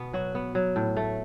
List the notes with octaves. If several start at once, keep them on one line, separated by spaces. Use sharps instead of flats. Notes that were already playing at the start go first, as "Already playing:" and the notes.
Already playing: B2 B3
F#3 F#4
B3
F#3
A2
A3